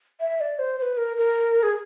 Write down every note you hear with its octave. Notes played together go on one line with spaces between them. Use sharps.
E5
D5
C5
C5
B4
A#4
A#4
G#4